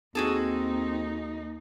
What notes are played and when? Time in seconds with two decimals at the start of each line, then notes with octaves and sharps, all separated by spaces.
0.15 D#2 C4 D#4 F#4 G#4 A4